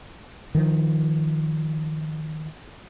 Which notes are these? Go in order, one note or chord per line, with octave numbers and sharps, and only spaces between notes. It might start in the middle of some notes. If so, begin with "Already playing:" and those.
D#3 F3